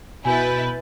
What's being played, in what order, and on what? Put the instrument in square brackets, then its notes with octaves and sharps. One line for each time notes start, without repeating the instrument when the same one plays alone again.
[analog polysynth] B2 G6 A6 [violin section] E4 B4 [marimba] G#5